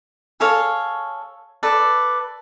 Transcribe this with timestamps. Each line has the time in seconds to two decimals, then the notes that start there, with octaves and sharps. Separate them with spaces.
0.40 G#4 A4 C#5 F5
1.63 A4 B4 D5